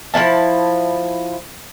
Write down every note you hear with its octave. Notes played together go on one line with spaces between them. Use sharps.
F3 A#3 E4 A5